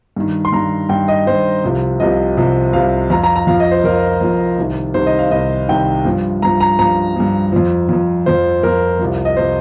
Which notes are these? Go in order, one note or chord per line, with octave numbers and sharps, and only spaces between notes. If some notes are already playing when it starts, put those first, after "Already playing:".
G2 D#3
C6
G2 D#3 A#5
G2 D#3 G5
D#5
G2 D#3 C5
C2 C3 F3
C2 C3 F3 D#5
C2 C3 F3
C2 C3 F3 F5
F2 F3 A#5
A#5
A#5
F2 F3 F5
D#5
C5
F2 F3 A#4
F2 F3
C2 C3 D#3
C2 C3 D#3 C5
D#5
F5
C2 C3 D#3 D#5
C2 C3 D#3 G5
G2 F3
G2 F3 A#5
A#5
G2 F3 A#5
G2 F3
F2 F3
F2 F3
F2 F3 C5
F2 F3 A#4
C2 C3 F3
D#5
C3 F3 C5